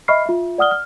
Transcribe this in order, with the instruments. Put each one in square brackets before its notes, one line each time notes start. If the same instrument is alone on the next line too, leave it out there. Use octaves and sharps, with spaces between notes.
[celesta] D#5 E5 B5 C#6 F6 C7
F4 E5
D5 F#5 D#6 F6 G7
F6